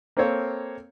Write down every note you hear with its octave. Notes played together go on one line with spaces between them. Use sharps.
A#3 C4 A4 C5 C#5 F5